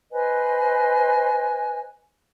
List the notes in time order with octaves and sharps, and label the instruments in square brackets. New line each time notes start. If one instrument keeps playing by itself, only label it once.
[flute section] B4 C5 D#5 G#5